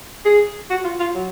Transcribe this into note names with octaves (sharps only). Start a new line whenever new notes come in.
G#4
F#4
F4
F4
F#3